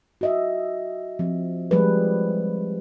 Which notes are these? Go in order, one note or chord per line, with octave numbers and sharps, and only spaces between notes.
F#4 D#5 E5
F3 C4
F3 G3 G#3 G#4 B4